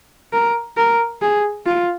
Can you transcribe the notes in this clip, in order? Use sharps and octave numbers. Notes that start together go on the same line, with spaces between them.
A#4
A#4
G#4
F4